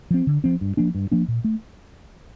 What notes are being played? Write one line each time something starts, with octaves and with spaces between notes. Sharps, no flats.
F3 C4
D3
F3 C4
G2
F3 A#3 D4
G2
F3 A#3 D4
A#2
A3